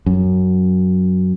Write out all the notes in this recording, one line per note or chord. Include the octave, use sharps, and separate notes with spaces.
F#2